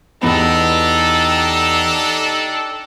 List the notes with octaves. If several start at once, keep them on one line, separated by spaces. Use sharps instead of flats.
E2 B3 D4 D#4 G4 A4 B5